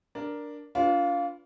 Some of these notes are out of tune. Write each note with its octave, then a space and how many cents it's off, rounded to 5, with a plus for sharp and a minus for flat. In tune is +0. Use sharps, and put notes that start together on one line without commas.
D4 +0 A#4 +5
D4 -40 F4 +0 B4 +0